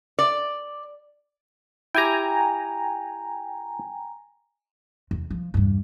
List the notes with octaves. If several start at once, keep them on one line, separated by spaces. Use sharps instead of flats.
D5
E4 G4 G5 G#5 A#5
E2
F3
E2 G2